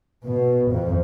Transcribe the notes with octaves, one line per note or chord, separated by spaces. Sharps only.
B2
F2